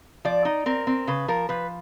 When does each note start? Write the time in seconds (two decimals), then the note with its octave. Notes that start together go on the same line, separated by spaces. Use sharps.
0.25 F3 D5
0.45 D#4
0.66 C4 A#4
0.87 C4
1.07 C#3 B4
1.28 F3 A#4
1.49 F3 B4